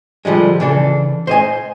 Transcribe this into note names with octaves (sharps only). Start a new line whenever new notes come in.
D3 F3 G3 G#3
C#3 E3 D4 A4
C5 D#5 G#5